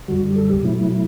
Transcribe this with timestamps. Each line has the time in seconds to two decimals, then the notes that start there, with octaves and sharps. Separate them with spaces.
0.08 F#2 D3 G3 F#4
0.31 G4
0.36 A4
0.50 G4
0.63 B2 F#3 A3 E4